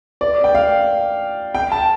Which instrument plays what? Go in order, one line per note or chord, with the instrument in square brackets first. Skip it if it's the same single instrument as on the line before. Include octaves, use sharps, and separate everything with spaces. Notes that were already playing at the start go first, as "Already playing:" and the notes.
[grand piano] D5
G5
F5
G5
A5